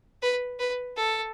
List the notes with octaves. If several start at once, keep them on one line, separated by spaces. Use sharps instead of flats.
B4
B4
A4